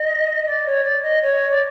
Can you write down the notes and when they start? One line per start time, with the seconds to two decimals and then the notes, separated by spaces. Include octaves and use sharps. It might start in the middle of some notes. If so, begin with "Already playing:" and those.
Already playing: D#5
0.46 D5
0.66 C#5
0.84 D5
1.02 D#5
1.22 C#5
1.50 D5